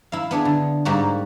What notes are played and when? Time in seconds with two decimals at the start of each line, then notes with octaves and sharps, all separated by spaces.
0.12 E4 F5
0.31 B3 D4 G#4
0.45 D3
0.85 G#2 G3 A#3 F#4